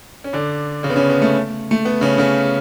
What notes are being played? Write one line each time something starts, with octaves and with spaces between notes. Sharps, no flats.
C#4
D3 D4
C#3 C#4
B3
C#3 C#4
B3
A3
A3
B3
C#3 C#4
C#3 C#4